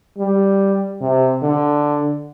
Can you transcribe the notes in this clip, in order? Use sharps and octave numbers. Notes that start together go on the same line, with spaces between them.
G3
C3
D3